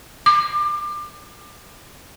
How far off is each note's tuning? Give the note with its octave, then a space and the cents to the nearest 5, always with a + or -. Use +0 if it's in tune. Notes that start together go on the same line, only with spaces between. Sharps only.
D6 +25